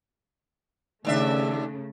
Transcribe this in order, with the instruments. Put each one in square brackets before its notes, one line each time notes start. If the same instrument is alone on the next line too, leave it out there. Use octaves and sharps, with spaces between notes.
[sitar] D#2 D4 E5 [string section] C#3 A3